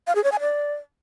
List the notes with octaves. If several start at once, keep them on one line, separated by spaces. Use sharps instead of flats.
F5
G#4
C#5
G#5
D5